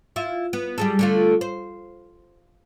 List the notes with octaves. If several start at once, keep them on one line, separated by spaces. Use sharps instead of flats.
E4 F4
B3
G3 G#4 A4
D3 A3 F4
C5